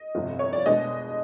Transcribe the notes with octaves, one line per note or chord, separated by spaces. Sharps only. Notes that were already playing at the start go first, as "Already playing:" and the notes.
Already playing: D#5
G1 F2 C3
C#5
D5
B2 G#3 B3 D4 D#5